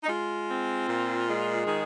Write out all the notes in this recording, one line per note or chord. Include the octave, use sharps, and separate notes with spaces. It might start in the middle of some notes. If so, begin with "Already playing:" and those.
D#4
G#3 F4
C4
A#2
G#3
D#3 G#4